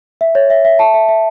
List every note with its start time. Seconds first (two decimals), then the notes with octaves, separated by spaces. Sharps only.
0.21 E5
0.35 C#5
0.50 E5
0.65 E5
0.79 A5
0.94 E5
1.09 E5